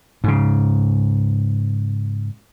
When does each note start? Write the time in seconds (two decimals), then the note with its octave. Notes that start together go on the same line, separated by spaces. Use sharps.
0.24 G#2 C#3